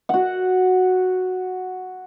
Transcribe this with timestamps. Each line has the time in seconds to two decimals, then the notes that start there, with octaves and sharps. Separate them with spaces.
0.09 F#4 F#5